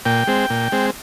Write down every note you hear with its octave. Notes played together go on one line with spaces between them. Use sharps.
A#2 G5
G#3 C4
A#2
G#3 C4